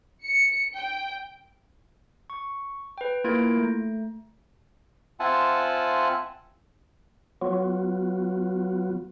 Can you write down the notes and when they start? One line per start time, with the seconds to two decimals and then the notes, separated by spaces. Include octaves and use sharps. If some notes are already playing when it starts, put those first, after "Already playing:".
0.24 C#7
0.75 G5
2.30 C#6
2.98 B4 G5
3.24 A#3 E4 F4 A#4 G#6 D7
3.57 A3
5.20 C4 F4 E5 F#5 G#5 A5
7.42 F#3 B3 F4 F#4